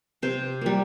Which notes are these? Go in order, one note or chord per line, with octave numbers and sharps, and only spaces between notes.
C3 C5
G3 A#3